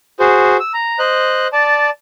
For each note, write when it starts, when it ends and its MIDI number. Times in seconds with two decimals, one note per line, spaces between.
0.20 0.57 66
0.20 0.57 68
0.20 0.57 72
0.60 0.73 88
0.74 0.99 82
0.99 1.48 72
0.99 1.48 75
0.99 1.48 90
1.53 1.90 74
1.53 1.90 81